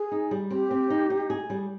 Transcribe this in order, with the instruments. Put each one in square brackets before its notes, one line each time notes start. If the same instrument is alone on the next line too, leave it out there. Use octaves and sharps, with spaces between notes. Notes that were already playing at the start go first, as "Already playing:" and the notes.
Already playing: [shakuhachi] G#4
[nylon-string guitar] D#4
G3
[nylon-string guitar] C4 [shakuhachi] G4
[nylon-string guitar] C4
D#4
D#4
G#4
G3